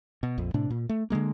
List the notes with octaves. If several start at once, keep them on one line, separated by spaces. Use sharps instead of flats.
B2
A#1 F2
A2 C3 D4
A#2
A3
D3 D#3 G#3 A#3